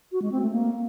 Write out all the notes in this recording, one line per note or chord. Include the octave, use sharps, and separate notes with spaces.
F#4
G#3
C4
A3
A#3